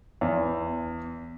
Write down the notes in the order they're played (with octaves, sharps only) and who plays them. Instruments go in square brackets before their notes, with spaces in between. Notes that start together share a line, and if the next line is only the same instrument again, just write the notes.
[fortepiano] E2